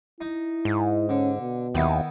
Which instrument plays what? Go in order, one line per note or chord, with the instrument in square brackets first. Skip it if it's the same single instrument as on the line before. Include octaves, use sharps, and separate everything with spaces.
[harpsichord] D#4 [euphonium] E4
[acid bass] G#2
[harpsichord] D3 [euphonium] C#4
[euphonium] B2
[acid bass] D#2 [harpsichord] D#3 B3 E4